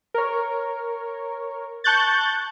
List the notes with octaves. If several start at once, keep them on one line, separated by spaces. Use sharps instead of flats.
A#4 C#5
A5 C#6 F#6 G6 A6